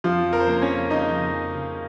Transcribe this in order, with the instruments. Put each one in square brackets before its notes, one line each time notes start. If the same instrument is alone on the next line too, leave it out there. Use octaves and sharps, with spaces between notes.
[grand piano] F2 F3 F4
F2
A#4
C5
C#3 A#3 A#4
C#4 C#5
F2
C#3 D#4 D#5
F2
C#3
C#3